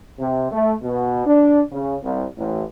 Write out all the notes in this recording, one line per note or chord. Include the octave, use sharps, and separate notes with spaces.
C3
A3
B2
D4
C#3
C2
A1